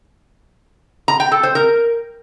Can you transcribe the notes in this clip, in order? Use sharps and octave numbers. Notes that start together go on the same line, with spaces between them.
A#5
G5
A4
C5
A#4